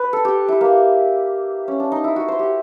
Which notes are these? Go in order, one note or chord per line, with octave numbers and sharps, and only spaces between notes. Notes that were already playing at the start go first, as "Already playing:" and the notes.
Already playing: B4
A4
G4
E4
A#3
C#4
D4
D#4
E4
F#4
C5
G4